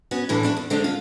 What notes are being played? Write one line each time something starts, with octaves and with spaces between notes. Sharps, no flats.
B3 C#4 F#4
A2 D3 E3 A4
A3 D4 F#4
E2
D3 G#3 A3 C4 D4
F4